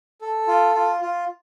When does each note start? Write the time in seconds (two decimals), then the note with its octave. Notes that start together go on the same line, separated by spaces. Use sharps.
0.21 A4
0.48 F4
0.75 F4
1.02 F4